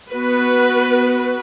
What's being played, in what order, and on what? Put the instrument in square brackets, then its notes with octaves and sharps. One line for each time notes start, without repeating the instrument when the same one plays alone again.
[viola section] B3 F#4 B4